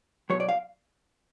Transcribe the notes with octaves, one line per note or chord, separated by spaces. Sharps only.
B2 F#3 C#5
D5
F5